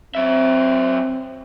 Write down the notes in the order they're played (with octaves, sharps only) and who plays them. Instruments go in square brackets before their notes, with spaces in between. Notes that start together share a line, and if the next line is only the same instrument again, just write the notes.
[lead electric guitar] F#3 E5 [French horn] C4